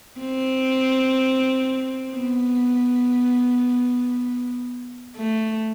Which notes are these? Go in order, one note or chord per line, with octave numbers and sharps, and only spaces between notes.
C4
B3
A3